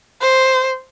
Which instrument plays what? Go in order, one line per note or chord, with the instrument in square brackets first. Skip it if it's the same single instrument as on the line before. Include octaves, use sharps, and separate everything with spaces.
[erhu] C5